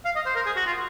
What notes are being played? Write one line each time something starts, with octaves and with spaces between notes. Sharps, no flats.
F5
D#5
C5
A#4
G#4
F#4
F4